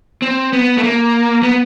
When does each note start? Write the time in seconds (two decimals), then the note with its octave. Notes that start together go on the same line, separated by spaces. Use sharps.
0.22 C4
0.53 B3
0.78 A3
0.83 A#3
1.43 B3